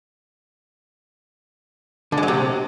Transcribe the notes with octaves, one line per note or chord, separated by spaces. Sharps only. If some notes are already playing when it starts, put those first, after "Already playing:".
D3
G#3
F#3
C3